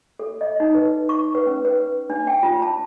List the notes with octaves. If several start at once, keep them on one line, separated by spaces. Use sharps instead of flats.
A4
D#5
D#4
B4
C#6
B4
C#4
B4
D4
G5
F4
A5